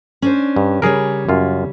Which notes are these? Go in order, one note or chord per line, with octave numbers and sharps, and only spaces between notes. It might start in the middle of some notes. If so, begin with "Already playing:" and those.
C#4 D4 C5
G2
C#3 G3 G#4 A#4 C#5
F#2 F4